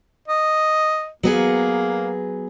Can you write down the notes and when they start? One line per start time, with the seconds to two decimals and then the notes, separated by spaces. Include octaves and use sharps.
0.28 D#5
1.23 F#3 A#3 B3 G#4